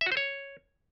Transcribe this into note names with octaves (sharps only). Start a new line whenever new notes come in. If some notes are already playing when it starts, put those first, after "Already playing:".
E5
F#4
C5
C#5